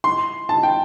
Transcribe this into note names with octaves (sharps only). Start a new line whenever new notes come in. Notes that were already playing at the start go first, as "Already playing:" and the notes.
C6
A5
G5